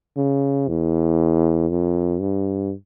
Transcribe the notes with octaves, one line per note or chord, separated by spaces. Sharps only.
C#3
E2
F2
G2